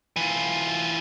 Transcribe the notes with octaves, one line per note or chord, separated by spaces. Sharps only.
E3 F4